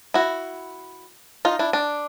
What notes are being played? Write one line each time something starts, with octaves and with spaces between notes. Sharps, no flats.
E4 F#4
D#4 F4
D4 E4
D4